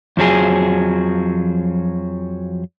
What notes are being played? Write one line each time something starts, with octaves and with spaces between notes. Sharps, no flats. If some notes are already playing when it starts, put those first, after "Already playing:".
F2 F3 F#3 G#4